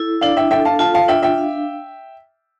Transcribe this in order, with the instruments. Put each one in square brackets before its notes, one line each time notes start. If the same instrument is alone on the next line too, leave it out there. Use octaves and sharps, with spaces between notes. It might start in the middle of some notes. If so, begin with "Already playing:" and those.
Already playing: [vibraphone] E4 A4
[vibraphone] D4 [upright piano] D5 F5
[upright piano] E5 G5
[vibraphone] A4 [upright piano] E5 G5
[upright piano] F5 A5
[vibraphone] F4 [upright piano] F5 A5
[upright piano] F5 A5
[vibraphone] D4 [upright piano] E5 G5
[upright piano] E5 G5
[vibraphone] F5